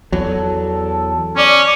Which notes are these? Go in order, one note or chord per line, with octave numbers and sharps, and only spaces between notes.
E2 F#3 A4
C#4 D5